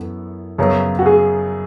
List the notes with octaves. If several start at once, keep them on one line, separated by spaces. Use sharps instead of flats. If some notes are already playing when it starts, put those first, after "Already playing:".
Already playing: F#2 E3 B3 E4 A4
F#2 C#3 F#3 B3
F#4
G#4